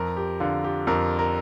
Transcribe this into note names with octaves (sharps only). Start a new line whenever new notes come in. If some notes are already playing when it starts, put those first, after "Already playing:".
Already playing: F2 A#4
G4
D3 F4
G4
F2 A#4
A#4